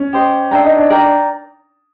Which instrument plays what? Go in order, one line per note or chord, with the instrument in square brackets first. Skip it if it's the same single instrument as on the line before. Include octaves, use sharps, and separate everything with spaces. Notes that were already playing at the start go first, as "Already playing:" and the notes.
Already playing: [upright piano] C#4
[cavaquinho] G4 C5 D#5
[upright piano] D4 [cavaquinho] C5 E5 G5 A#5
[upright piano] D#4
D4
[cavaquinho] A#4 D5 G5 A#5